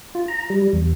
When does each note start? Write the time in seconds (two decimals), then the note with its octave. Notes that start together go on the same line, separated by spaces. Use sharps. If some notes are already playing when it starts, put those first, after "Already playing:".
0.15 F4
0.28 A#5
0.50 G3
0.73 E2